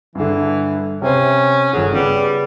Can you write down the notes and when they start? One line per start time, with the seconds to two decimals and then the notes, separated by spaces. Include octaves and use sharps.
0.15 G2 D3 E3
1.02 C3 C#4 C5
1.73 G1 F#3 G#4
1.93 C#3 G3 B3